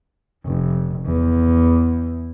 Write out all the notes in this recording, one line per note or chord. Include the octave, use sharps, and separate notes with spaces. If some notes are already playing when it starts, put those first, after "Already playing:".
F1
E2